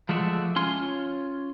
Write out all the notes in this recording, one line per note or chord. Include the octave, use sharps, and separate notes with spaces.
F3 G#3 A3 F#4 D5 E5
C#4 F4 C#5 G#5 C6